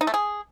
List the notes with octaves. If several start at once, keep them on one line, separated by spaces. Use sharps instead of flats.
D#4
A3
G#4